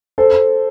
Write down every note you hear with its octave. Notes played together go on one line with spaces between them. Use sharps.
A4 C5